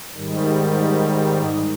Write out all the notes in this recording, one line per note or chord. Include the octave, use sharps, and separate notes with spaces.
G#2 D#3 G3